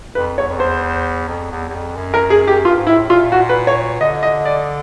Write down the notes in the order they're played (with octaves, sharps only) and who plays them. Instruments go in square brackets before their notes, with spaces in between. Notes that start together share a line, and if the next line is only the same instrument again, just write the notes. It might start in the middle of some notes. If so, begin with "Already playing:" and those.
[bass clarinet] F2 [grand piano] B4
[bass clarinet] E2 [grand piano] C#5
[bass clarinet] F2
[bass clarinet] E2 [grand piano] C5
[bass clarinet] F2
E2
E2
F2
F#2
[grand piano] A#4
G#4
G4
[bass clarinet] G2 [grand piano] F4
[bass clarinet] G#2
[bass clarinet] A2 [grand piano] E4
[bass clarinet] A#2 [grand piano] F4
[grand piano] F#4
B4
C#5
[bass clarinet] D3 [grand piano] D#5
[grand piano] D#5
D5